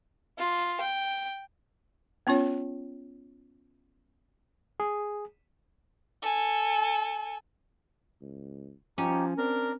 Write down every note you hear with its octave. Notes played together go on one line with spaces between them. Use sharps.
F4
G5
B3 C#4 F4 C#5
G#4
A4 G#5
C#2
F3 C#4 D#4 G4
C4 D4 A#4 A#5